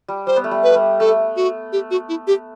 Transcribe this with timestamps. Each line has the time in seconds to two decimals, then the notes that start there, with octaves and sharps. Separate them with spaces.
0.08 G3
0.27 G3 C5
0.36 B3
0.44 A3
0.51 G3
0.63 B4
0.70 G3 A3
1.00 A3 A4
1.36 F#4
1.73 G4
1.91 F#4
2.09 E4
2.27 G4